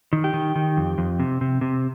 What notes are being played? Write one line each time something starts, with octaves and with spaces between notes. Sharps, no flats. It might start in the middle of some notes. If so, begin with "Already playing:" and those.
D#3
G4
D#3
D#3
F2
F2
C3
C3
C3